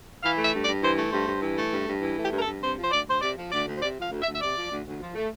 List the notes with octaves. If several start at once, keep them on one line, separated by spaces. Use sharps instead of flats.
E3 F5
A3
E5
G2
D5
G2
E3 C5
A3
G2 C5
G2
E3
A3
G2
G2
E3
A3
G4
G2 A#4
A4
G2
C3 C5
F3
C5
D2 D5
D2 C5
C3 D5
F3
D2 D5
D2
C5
C3 D5
F3 F5
D2
E5
D2
E5
C3 D5
F3
D2
D2
F3
A3